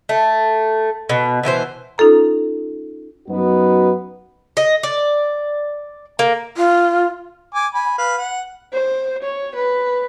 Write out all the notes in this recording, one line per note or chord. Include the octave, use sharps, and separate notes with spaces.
A3
B2
B2 E3 E4 C5
C#4 D#4 F4 A4 A#5
F#2 F#3 B3 D#4 F#4 B4
D#5
D5
A#3
F4
G#5 D6
G#5 B5
B4 F5
F#5
C5
C#5
B4